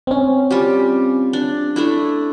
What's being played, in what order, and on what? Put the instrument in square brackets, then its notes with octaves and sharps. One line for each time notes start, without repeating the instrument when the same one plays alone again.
[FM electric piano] C4 C#4
[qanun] G3 F4 G4
D4
A3 D4 E4